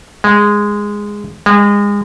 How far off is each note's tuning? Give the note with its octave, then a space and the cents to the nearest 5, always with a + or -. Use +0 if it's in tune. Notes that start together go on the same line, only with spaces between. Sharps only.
G#3 -10
G#3 -30